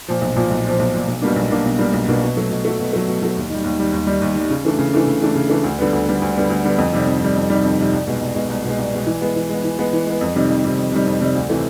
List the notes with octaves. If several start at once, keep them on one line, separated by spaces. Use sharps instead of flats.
A#2 F3
B1
A#2 F3
B1
A#2 F3
B1
A#2 F3
B1
B2 G3 A#3 D4
B1
B2 G3 A#3 D4
B1
B2 G3 A#3 D4
B1
B2 G3 A#3 D4
B2
F#3 A3
B2
F#3 A3
B2
F#3 A3
B2
F#3 A3
D#2
D#3 G3
D#2
D#3 G3
D#2
D#3 G3
D#2
D#3 G3
C#3
E3 A3 D4
C#3
E3 A3 D4
C#3
E3 A3 D4
C#3
E3 A3 D4
D2
D3 G3 B3
D2
D3 G3 B3
D2
D3 G3 B3
D2
D3 G3 B3
F2
C3 D#3 G3
F2
C3 D#3 G3
F2
C3 D#3 G3
F2
C3 D#3 G3
C2
B2 G#3
C2
B2 G#3
C2
B2 G#3
C2
B2 G#3
E3
G#3 B3
E3
G#3
B3
E3
G#3 B3
E3
G#3 B3
F2
C3 D#3 G3
F2
C3 D#3 G3
F2
C3 D#3 G3
F2
C3 D#3 G3
D2
C3 E3 A3